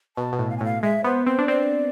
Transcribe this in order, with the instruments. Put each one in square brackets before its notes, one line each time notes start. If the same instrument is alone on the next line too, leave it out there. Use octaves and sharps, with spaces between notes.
[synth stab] B2 [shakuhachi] A5
[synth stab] B2
A2
[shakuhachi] F5
G#5
[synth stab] A2
[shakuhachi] F5
[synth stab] G#3 [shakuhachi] E5
[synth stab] B3 [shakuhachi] C5
[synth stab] C4 [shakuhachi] C5
[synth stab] D4
[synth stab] C4 [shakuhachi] D5